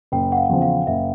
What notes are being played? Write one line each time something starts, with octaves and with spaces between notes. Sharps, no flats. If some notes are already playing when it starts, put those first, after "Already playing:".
F#1 G5
F#5
F5
E2 C#3 F3
F5
F#1 E5